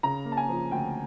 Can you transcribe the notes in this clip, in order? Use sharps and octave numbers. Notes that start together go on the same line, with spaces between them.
C#3 A#5
A#3
A5
G#5
F3
D2 G5